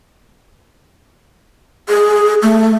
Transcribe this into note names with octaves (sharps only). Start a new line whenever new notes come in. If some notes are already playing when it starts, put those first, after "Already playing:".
G#4
A3